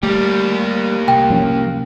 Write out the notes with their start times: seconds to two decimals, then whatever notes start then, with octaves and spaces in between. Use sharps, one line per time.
0.03 G3 A3 A#3 G4
1.08 C2 G5
1.30 F3 F#3 C#4